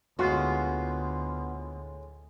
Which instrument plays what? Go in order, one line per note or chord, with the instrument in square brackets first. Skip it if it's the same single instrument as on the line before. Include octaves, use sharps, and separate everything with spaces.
[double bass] D2 [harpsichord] A2 G#3 [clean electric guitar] B3 F4 [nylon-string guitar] F#4